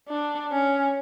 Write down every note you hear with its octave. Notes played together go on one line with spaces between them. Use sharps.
D4
C#4